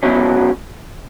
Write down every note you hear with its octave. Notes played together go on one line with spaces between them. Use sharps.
C#2 B2 F#3 C#4